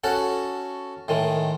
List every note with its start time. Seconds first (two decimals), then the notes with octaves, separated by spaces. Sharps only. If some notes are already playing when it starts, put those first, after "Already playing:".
0.04 C#4 F#4 A4 F#5
1.08 A2 D#3 G#3